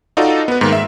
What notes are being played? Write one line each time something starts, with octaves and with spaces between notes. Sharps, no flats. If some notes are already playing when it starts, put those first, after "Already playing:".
D#4 F4 F#4 A4 D5 D#5
B3 B4
G#2 D#3 A#3
E5